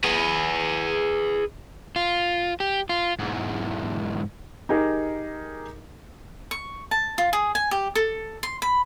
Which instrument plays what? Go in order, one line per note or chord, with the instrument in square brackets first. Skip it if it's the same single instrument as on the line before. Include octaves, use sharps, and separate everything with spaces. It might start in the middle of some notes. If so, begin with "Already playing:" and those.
[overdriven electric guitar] G#4 B4
[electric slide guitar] F4
G4
F4
[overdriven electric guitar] E2 G#2
[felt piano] D#4 G4 G#4 A#4 D#5
[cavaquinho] C#6
A5
F4
G#4
G#5
G4
A4
C6
B5